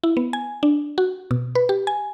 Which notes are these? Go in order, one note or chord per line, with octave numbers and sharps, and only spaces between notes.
E4
B3
G#5
D4
F#4
B2
B4
G4
G#5